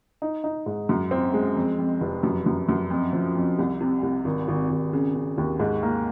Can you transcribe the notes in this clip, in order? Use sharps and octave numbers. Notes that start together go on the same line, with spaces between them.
D#4
D#4
G#2
F#2
C4
G#3
F2
F2
F1
F#2
F#2
F#2
F2
F3
F2
C2
C3
C2
G#1
G#1
G#1
C#3
C#3
D#2
G#2
A#3